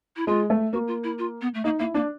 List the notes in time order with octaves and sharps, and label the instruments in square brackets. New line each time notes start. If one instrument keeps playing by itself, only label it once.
[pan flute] E4
[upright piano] G#3 [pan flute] F4
[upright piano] A3
[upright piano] A#3 [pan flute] F#4
[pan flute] F4
E4
F4
B3
A3
[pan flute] A#3 [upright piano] D#4
[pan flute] A#3 [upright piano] E4
[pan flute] A#3 [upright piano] D4